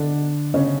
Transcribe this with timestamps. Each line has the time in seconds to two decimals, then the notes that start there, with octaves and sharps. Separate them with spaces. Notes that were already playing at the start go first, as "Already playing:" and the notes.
Already playing: D3 D4
0.54 C#3 C#4